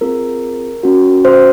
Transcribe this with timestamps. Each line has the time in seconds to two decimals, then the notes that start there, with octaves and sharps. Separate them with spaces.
0.01 C4 F4 G#4 A#4
0.83 C#4 F#4
1.25 C5